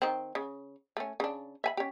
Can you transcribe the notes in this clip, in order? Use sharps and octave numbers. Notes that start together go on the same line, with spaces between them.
D#3 C4
C#3
A3 C#4
C#3 D4
E5 G#5 B5
C#4 G4